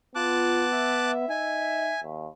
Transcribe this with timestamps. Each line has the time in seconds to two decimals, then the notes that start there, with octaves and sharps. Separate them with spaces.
0.15 B3 F4 A5 D6 F#6
0.72 E5
1.29 D#4 G#5
2.03 D#2